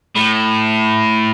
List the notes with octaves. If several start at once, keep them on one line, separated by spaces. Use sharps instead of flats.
A2